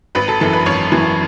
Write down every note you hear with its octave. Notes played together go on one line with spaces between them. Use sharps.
G#1 B4 B5
A4 A5
F#2 E3 A4 A5
B4 B5
G#1 C#5 C#6
F#2 E3